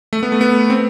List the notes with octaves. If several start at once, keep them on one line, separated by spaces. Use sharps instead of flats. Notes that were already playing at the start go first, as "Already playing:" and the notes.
A3
B3
A3
B3
C4